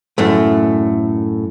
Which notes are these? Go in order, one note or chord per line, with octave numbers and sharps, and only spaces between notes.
F#2 A2 A3